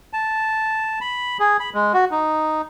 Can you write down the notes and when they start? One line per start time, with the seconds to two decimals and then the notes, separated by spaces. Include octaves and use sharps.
0.13 A5
1.01 B5
1.40 G#4
1.60 B5
1.74 G#3
1.93 F#4
2.11 D#4